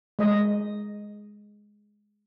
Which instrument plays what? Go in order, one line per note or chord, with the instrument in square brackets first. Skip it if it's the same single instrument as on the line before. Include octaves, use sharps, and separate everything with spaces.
[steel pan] G#3 D#5